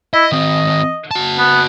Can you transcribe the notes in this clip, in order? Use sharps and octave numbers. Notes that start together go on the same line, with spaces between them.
E4 D#5
D#3 C4 D#5
F#4 A5
B3